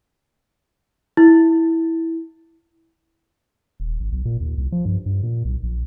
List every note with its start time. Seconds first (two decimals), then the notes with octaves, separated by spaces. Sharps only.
1.17 E4
3.80 D#1
4.00 G#1
4.12 B1
4.25 A#2
4.41 D#2
4.58 C2
4.72 F3
4.85 G2
5.06 G2
5.23 A#2
5.45 B1
5.63 A#1